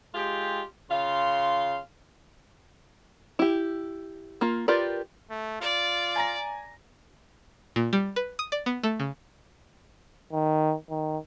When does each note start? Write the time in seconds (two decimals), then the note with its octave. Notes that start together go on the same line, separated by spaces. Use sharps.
0.13 G#3 F4 G4
0.89 C#3 F4 F5 C6
3.39 E4 G4
4.41 A#3 F4
4.68 F4 G4 A#4 B4 D5
5.30 A3
5.61 F4 D5
6.16 G#5 A#5 A#6
7.76 A#2
7.93 G3
8.16 B4
8.39 D#6
8.52 D5
8.66 B3
8.84 A3
9.00 C#3
10.33 D#3
10.90 D#3